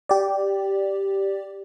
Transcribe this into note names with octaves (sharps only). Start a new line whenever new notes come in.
G4 D5